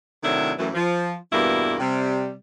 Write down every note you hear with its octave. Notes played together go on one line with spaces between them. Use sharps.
A2 C3 D#3 F#3 D4 E4
F#2 A2 E3
F3
E2 G2 B2 G3 A#3 E4
C3 G3